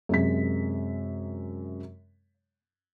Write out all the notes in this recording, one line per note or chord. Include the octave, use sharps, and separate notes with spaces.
F#2 C3 G#3 B6